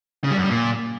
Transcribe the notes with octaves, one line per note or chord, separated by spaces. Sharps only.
C#3
G3
F#2
G3
A#2